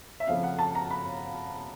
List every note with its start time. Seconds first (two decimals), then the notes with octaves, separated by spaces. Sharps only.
0.20 E5
0.27 F2 C#3 F3 A3 C#4 F5
0.43 F#5
0.59 A5
0.75 A#5
0.91 B5